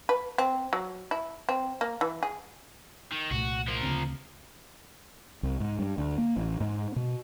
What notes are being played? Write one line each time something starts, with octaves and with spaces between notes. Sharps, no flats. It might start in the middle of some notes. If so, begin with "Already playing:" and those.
B4
C4
F#3
E4
C4
A#3
E3
G#4
D#3
C2 A#2 A3 F#4
F3 A#4
D2 C#3 C4
C2
G#2
G2
D2
A#3
A1
G#2
B2